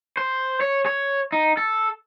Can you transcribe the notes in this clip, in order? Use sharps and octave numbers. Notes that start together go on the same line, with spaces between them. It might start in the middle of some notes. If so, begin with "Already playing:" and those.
C5
C#5
C#5
D#4
A4